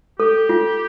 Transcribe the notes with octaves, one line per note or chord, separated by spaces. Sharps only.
G4 A4
F4